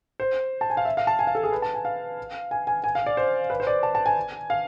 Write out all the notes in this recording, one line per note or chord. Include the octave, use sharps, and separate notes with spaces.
C5
A5
G#5
F5
E5
F5
A5
G#5
F5
A4
G#4
B4
A5
G#5
F5
G#5
G#5
G#5
F5
D5
C5
B4
C5
D5
A5
A5
G#5
F5